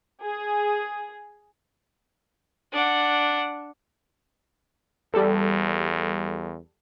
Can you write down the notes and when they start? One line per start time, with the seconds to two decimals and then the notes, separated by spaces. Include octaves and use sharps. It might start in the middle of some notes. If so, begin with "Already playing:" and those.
0.23 G#4
2.72 D4 F#5
5.14 E2 G3 A4